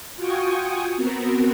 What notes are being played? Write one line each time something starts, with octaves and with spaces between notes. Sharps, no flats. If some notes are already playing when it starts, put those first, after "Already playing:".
F4 F#4 G5 G#5 C#6 D#6
B3 C4 F#4 A#4